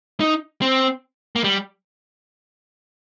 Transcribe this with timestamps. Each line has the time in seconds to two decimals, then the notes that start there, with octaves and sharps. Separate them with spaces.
0.20 D#4
0.62 C4
1.36 A#3
1.44 G3